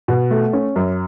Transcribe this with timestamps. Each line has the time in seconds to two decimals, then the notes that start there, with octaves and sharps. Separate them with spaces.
0.08 B2
0.31 A3
0.53 C#4
0.76 F#2